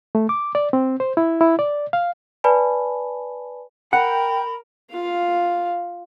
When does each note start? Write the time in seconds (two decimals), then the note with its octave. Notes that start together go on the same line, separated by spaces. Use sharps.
0.15 A3
0.29 D6
0.55 D5
0.73 C4
1.00 C5
1.17 E4
1.41 E4
1.59 D5
1.93 F5
2.44 B4 D5 G#5 A5 B5
3.93 A#4 F#5 G5 B5
4.91 F4 F5